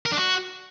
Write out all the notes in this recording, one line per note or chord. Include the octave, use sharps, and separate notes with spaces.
A#4
D4
F#4